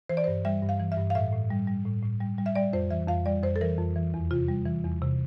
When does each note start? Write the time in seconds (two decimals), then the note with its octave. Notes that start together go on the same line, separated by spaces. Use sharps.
0.09 E3 C5
0.17 D5
0.24 G2 C5
0.45 G3 E5
0.63 G2
0.69 F5
0.80 E3
0.92 E5
0.97 G2
1.10 F5
1.15 A2 E5
1.33 A2
1.50 G3
1.67 G3
1.85 A2
2.02 A2
2.21 G3
2.38 G3
2.46 E5
2.55 G3 D5
2.73 F2 C5
2.90 E3 E5
3.08 F2 F5
3.26 G3 D5
3.43 F2 C5
3.56 A4
3.61 E3 A#4
3.78 F2
3.96 E3
4.14 E2
4.31 C3 F4
4.48 G3
4.66 E3
4.84 E2
5.02 C3